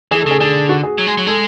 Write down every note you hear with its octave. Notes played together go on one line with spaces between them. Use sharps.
E3 G#4
A4
C#3 G#4
D3 G#4
F#4
G#4
F#3
G#3
F#3
G#3 A4